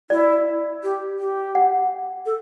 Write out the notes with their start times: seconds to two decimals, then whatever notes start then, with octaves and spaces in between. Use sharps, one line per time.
0.10 E4 D5
0.83 G4
1.19 G4
1.55 F#5
2.26 A4